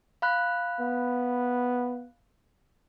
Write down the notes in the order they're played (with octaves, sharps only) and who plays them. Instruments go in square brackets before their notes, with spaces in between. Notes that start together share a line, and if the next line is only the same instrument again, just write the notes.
[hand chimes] F5 B5 F#6
[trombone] B3